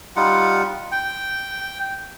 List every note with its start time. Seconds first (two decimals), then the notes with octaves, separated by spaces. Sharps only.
0.16 G3 D#4 F4 F#5
0.92 G5